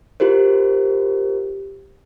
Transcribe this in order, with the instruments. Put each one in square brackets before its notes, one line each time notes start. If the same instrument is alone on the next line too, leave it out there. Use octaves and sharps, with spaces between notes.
[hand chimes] F4 G4 A#4 C5